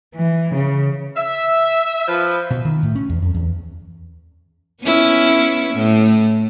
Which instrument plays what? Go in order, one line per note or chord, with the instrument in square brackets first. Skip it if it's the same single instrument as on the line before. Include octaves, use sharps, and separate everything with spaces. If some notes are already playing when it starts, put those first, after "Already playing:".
[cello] E3
C#3
[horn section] E5
F3 B4
[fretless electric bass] B2
D#3
A2
C#4
E2
F2
E2
[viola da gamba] B3 C#4 E4
A2